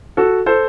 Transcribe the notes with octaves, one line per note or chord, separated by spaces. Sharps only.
F#4 A4
A4 C5